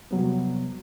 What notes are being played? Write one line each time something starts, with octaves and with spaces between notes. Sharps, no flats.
F2 C3 F#3 G3 B3